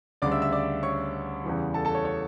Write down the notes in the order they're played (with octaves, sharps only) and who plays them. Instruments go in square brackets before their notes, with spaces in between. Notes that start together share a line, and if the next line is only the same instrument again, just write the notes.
[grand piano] D2 C#3 G3 D5 D6
E5 E6
E5 E6
D5 D6
C#5 C#6
E2 C#3 E3 G3
A4 A5
A4 A5
C#5
C#5